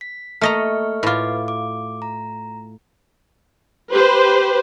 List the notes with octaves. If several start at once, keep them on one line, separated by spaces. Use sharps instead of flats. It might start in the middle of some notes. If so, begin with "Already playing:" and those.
B6
A3 A#3 D#5 A#5 C#6 F6
A2 F4 B4 D6
D6
A#5
G4 B4 C5